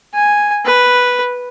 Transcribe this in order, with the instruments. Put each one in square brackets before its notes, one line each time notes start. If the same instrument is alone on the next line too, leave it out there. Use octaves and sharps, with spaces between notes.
[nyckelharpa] G#5
B4